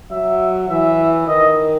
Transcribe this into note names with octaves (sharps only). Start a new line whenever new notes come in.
F#3 E5
E3 E5
D#3 D#5